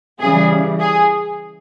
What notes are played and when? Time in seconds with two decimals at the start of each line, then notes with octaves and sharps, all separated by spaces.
0.20 C#3 E3 G3 G#4
0.80 G#4